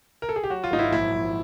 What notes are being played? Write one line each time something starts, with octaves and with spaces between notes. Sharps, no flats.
A#4
A4
G#4
G4
F#3 F#4
F4
G#1 D#4
E4
A#1 E4
A#1